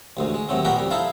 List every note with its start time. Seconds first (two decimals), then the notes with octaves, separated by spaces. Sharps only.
0.17 A1 D2 G#2
0.34 G#3
0.49 D#2 A2 F#3 C4
0.65 A#2 B3 F#4 G4 A#4
0.77 F2 G3
0.91 D#4 E4 A4 C5 F5